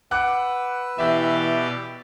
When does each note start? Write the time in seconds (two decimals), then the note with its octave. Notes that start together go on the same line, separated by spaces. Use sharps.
0.11 B4 F#5 D6 E6 F#6
0.98 B2 E3 G4 D5 E5